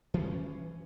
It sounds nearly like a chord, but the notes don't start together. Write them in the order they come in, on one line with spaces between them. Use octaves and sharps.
E3 D4 C#4